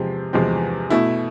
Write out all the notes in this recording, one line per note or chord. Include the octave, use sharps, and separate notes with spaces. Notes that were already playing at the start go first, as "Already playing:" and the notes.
Already playing: E2 C3 F3 G#3 C4
E2 C3 F3 G#3 C4
B2 A3 E4